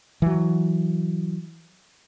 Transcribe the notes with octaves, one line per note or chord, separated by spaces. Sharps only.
E3 F#3